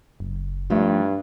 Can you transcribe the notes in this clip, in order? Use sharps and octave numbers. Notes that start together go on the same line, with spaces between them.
F#1
G2 F3 A3 D#4 G5